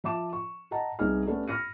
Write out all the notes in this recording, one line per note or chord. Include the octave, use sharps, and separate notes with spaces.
F3 E5 A5 D6 E7
C#6
D#5 F#5 A5 A#5
C2 B3 D#4 G#4 F6
A3 B3 C#4 D4 G4 A4
B5 F6 A#6 C#7 D#7